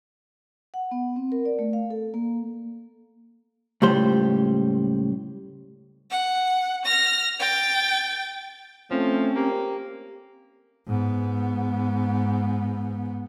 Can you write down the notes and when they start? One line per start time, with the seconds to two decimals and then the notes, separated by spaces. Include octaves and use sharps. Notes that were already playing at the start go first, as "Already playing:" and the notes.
0.74 F#5
0.91 B3
1.16 C4
1.32 A#4
1.45 D5
1.59 A3
1.73 F5
1.90 A4
2.14 A#3
3.82 C#2 A2 G3 C5
6.10 F#5
6.85 F6 A#6
7.39 G5 A6
8.91 F3 A3 C4 C#4
9.36 A#3 G4
10.87 G#2 B3